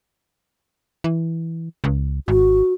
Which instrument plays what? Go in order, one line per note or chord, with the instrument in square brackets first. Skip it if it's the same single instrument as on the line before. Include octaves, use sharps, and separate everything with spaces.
[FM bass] E3
C#2
[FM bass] G#1 [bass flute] F#4